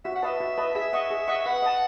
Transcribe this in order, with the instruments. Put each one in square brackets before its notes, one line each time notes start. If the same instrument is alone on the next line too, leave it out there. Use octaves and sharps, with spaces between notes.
[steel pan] F#4 [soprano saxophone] E5
[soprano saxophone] F#5
[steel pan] B4 D#5 A5 [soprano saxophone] E5
[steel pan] F#4
B4 D#5 A5
[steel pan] G#4 [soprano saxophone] E5
[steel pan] D#5 F#5 C#6
G#4
D#5 F#5 C#6
[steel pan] B4 [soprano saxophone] F#5
[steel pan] D#5 A5